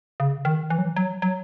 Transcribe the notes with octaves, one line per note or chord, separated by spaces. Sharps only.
C#3
D#3
E3
F#3
E3
F#3
F#3